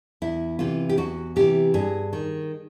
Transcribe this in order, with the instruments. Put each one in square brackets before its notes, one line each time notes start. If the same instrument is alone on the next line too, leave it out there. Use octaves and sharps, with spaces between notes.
[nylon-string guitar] E2 E4
C3 E3 F4
G4
E2 F#4
C3 E3 G4
G2 G#4
D#3